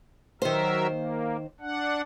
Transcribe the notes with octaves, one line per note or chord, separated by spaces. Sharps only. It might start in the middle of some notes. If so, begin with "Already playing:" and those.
D#3 F#3 A#4 C5 E5
A#3
D4 F#5